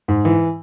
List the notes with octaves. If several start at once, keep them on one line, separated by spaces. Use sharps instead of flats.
G#2
E3